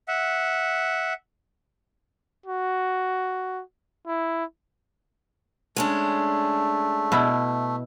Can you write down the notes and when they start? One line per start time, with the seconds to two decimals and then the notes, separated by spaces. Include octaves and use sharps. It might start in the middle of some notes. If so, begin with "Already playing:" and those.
0.08 E5 F#5
2.46 F#4
4.07 E4
5.76 G#3 A3 C#4 D4
7.12 B2 E4